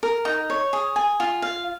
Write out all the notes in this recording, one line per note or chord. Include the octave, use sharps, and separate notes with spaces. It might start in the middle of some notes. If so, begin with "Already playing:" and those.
A#4
D#4
C#5
G#4
G#5
F4
F5